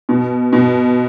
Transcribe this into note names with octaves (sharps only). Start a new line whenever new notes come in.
B2
B2